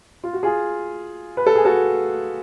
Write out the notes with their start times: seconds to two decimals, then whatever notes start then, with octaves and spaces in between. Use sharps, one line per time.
0.24 F4
0.33 F#4
0.43 F4 G#4
1.37 B4
1.46 A4
1.55 G#4
1.65 F#4 A4